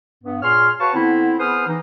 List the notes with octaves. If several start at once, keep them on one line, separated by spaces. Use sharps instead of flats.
G2 B3
A#2 G#4 C#5 C6 F6
F#4 B4 C#5 F5 A5 C#6
D3 B3 C4 E4
B3 G#4 B4 C5 D#6 F6
E3 D#4